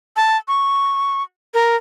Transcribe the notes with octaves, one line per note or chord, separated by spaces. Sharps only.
A5
C#6
A#4